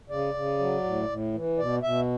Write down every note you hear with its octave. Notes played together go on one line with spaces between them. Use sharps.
C#3 D5
C#3
F#3
A2
A2
E3
B2 D5
B2 E5